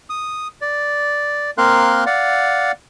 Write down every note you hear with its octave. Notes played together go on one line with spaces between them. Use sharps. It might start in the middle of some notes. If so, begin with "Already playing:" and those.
D#6
D5
A#3 C4 A#4 F5 C6 F#6
D5 F5 F#5